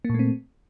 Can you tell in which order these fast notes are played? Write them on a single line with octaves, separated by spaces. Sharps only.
A#3 A#2 A3 C4